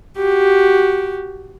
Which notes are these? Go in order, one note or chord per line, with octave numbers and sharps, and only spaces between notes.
F#4 G4